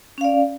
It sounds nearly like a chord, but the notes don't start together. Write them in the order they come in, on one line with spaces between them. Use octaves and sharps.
C#4 F5 D5